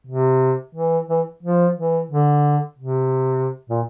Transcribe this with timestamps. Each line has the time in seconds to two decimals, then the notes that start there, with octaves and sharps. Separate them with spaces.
0.07 C3
0.75 E3
1.09 E3
1.43 F3
1.77 E3
2.11 D3
2.79 C3
3.70 A#2